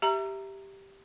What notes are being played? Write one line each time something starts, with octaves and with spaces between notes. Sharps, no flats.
G4 E5 A#5